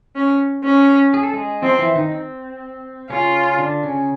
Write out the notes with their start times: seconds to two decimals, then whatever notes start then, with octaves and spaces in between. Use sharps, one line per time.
0.15 C#4
0.64 C#4
1.14 G#4
1.23 A4
1.34 G#3 G#4
1.62 F3 C4 F4
1.79 E3 E4
1.95 D#3 D#4
2.12 C4
3.10 C#3 C#4 F4
3.59 D3 D4
3.83 C#3 C#4